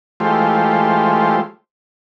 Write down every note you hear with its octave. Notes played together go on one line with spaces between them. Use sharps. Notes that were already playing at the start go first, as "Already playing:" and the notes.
E3 G#3 A3 F4 G4 C5